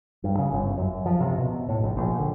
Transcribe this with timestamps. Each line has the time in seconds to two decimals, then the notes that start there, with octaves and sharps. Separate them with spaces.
0.24 G2
0.38 C#3
0.52 G1
0.78 F#2
1.06 F3
1.20 C3
1.38 B2
1.69 A2
1.83 A#1
1.97 A#1
2.18 D3